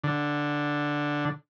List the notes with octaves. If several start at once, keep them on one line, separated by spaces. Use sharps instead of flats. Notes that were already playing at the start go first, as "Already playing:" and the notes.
D3